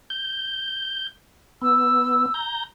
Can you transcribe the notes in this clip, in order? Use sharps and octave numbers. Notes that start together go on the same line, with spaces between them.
G6
B3 E6
A#5 G6